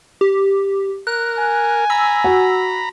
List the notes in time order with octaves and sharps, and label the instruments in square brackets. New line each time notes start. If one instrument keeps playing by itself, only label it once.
[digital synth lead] G4
[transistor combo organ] A#4 [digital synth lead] F#6
[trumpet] G#5
[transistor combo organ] A#5 B5 [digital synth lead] E6
[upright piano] F#4